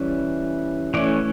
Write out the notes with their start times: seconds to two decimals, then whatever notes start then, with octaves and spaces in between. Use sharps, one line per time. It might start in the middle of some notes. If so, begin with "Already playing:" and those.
Already playing: E3 G3 C#4
0.94 E3 A3 C#4 D5